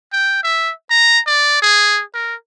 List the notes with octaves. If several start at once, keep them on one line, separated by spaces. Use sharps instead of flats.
G5
E5
A#5
D5
G#4
A#4